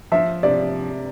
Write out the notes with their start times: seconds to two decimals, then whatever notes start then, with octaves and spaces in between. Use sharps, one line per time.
0.12 F3 E5
0.43 C3 D5